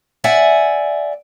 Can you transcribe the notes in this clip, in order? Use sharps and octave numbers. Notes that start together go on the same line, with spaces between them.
D5 E5 F#5 G#5